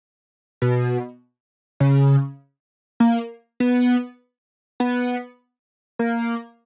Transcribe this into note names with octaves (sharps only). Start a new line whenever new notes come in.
B2
C#3
A#3
B3
B3
A#3